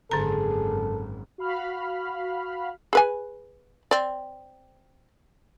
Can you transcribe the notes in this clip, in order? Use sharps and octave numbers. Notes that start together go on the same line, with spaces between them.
G#1 F#2 D3 G#4 A4 A#5
F#4 F5 B5 F6
G#4 B4 G#5
C4 D5